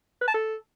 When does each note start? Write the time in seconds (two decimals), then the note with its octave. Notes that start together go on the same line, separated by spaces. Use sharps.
0.22 B4
0.28 A5
0.34 A4